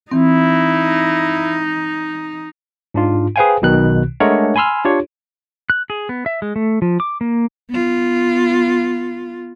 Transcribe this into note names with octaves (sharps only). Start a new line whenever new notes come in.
E3 C4 D#4 E4
G#2 D4 F4
G#4 B4 C5 F5 G5 G#5
B1 B2 D#3 F#6
G#3 A3 D4 A#4 C#5 F#5
G#5 B5 C6 E6 F6
D4 F4 G4 C#5
F#6
G#4
B3
E5
G#3
A3
F3
D6
A#3
B3 F4